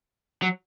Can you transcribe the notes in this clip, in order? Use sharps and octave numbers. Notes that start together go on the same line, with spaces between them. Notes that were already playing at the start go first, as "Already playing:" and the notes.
F#3